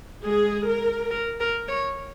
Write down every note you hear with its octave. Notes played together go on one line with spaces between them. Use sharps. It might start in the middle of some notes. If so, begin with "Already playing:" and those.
G#3 G#4
A#4
A#4
A#4
C#5